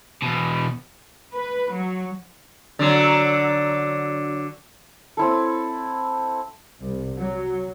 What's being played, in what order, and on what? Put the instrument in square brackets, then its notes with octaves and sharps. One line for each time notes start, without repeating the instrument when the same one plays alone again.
[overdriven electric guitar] E2 B2
[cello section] B4
F#3
[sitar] D3 F#3
[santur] C4 E4 A4
[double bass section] C2
F#3